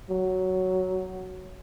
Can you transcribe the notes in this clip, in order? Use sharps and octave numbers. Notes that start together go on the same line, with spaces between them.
F#3